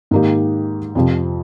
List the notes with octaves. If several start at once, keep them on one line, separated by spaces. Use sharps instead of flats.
G#2 D#3 A#3 D#4 G4
F2 C3 F3